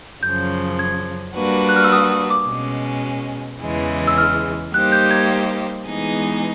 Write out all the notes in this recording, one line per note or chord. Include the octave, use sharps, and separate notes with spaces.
F#2 C#3 F3 G6
G#6
G3 A#3 D4 F#4 B4
F#6
F6
E6
D#6
D#6
D6
B2 G#3 C#4
E2 C#3 E3 G#3
E6
F6
G3 A#3 D#4 G4 C5 F#6
G6
G#6
E3 G#3 B3 D#4 G#4